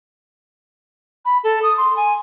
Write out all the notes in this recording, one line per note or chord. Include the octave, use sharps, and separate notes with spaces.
B5
A4
D#6
C6
G#5